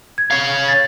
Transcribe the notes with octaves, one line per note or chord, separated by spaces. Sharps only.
G#6
C#5 F5
A6